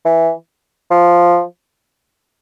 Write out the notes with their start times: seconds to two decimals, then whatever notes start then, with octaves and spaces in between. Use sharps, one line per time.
0.05 E3
0.91 F3